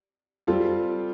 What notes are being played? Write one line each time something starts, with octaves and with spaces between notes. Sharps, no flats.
G3 C4 F4 A4